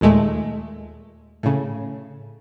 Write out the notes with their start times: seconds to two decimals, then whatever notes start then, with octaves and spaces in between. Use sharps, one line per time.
0.01 D#2 A#2 G#3 A3
1.43 A2 C#3